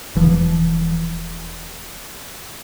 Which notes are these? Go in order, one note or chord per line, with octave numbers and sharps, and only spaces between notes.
E1 E3 F3